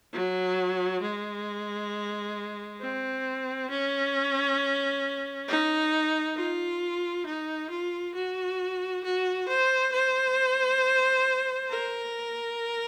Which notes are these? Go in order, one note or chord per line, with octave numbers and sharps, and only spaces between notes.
F#3
G#3
C4
C#4
D#4
F4
D#4
F4
F#4
F#4
C5
C5
A#4